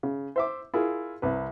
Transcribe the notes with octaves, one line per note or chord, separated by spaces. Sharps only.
C#3
C5 E5 D6
E4 F4 G#4 A#4
C2 C3 B4